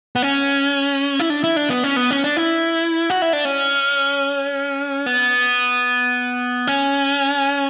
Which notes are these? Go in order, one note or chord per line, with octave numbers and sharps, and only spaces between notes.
B3
C#4
E4
D4
E4
D4
B3
C#4
B3
C#4
D4
E4
F#4
E4
D4
C#4
B3
C#4